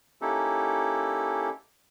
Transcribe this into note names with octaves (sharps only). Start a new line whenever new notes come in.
A#3 C#4 D#4 E4 G4 A4